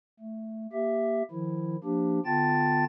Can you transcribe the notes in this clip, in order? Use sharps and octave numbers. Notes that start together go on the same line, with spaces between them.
A3
A#3 G4 E5
D#3 F3 E4
F3 A#3 D4 G4
D3 B3 F4 G5 A5 A6